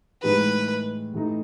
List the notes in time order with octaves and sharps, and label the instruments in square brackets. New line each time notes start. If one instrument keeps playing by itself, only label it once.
[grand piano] A2 E3 G#3 D#4 [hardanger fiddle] B4
[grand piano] A2 E3 A3 D#4